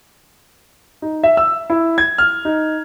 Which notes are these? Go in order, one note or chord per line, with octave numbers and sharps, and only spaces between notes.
D#4
E5
E6
E4
G#6
F6
D#4